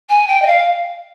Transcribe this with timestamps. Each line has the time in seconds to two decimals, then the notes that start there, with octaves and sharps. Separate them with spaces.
0.09 G#5
0.27 G5
0.42 D#5
0.46 F5